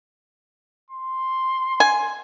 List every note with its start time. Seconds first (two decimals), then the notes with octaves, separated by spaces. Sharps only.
0.91 C6
1.80 G#5